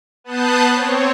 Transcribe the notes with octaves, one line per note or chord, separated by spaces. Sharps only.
B3 A5 D#6 F#6 G6 C7
C4 C#5